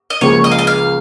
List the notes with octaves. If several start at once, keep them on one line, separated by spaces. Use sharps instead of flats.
D#5
C#2 C#3 F3 A#3 C#5
D#5
F5
D#5
F5